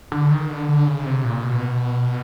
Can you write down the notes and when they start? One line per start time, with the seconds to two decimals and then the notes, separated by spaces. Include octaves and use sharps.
0.12 D3
0.31 D#3
0.49 D3
0.69 D3
0.87 C#3
1.06 C3
1.24 A#2
1.43 B2